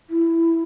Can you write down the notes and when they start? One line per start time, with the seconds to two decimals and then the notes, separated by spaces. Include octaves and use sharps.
0.10 E4